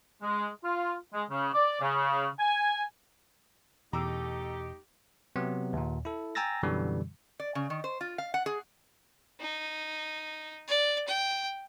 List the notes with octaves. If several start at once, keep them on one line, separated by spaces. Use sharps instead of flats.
G#3
F4
G#3
C#3
D5
C#3
G#5
E2 B2 A3 D#4 G4 A#5 D6 E6
C3 F#3 B3
D#2 A#2
E4 A4
G5 G#5 A#5 E6 A6 A#6
F#2 B2 D3 E3 G3
D5
C#3
D#3
C5
F4
F5
F#5
G#4
D#4
D5
G5